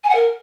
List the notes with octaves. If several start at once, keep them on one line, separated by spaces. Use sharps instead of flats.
G#5
F#5
A#4